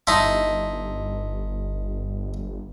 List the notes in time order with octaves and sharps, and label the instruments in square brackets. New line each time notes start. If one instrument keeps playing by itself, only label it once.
[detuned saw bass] G1 [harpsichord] D#4 E4 [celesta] D#5 A5 C6